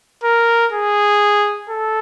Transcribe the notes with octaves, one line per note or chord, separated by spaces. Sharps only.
A#4
G#4
A4